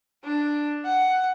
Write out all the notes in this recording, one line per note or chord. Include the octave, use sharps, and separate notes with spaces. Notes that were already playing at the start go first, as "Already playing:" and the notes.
D4
F#5